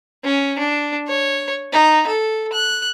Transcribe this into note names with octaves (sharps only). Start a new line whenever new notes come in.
C#4
D4
C#5
D#4
A4
F#6